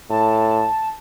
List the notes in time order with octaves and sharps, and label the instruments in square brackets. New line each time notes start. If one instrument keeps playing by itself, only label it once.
[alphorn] A2 [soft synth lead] A5